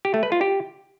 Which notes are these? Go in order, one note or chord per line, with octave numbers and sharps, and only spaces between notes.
G4
A3
B4
F4
G4